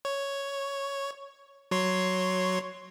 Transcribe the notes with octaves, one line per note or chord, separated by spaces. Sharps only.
C#5
F#3 C#5 C6